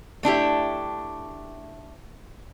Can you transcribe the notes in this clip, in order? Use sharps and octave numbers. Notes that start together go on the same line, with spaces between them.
A3 D4 E4 G4